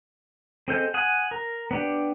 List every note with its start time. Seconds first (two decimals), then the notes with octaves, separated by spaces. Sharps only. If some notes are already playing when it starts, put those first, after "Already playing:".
0.68 C4 G#4 A4 D#5 G6
0.94 F#5 G#5 D#6
1.31 A#4
1.71 B3 D4 G4